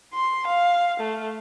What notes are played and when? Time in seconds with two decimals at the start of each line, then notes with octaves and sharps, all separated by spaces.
0.14 C6
0.47 F5
1.00 A3